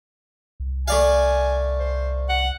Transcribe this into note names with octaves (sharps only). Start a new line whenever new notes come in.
C2
A3 D5 F5 G#5
C5
F#5